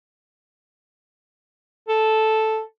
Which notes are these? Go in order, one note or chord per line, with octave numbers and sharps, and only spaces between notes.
A4